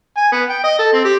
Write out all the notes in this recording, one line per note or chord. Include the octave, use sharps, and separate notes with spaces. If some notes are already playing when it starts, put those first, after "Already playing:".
G#5
B3
G5
D#5
A4
C4
G4